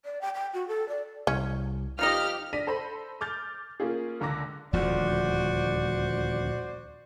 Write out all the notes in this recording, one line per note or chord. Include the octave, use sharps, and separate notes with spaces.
D5
G5
G5
F#4
A4
D5
C2 C#4
F3 D#4 G4 D#5 F5 F6
D4 D5 A#6 B6 D#7
A4 C5 B5
D6 F6 G6 A6
A#3 C#4 F4 G#4
C#2 D3 A#5 D6 A#6
D#1 D2 F3 F#4 C5 D5